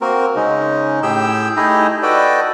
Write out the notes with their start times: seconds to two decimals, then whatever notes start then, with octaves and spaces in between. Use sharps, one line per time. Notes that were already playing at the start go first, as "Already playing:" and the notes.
0.01 A#3 C4 F#4 A#4
0.36 C#3 G#3 C#4 D#4
1.03 A2 G4 G#4 G5 E6 G6
1.57 A3 D#4 E4 G4 G#4 D#5
2.03 F#4 A4 B4 D5 D#5 G5